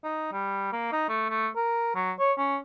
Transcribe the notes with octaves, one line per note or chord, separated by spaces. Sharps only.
D#4
G3
A#3
D#4
A3
A3
A#4
F#3
C#5
C#4